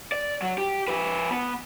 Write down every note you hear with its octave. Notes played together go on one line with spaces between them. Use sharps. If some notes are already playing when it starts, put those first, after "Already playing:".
D5
F#3
G4
F3 B4
B3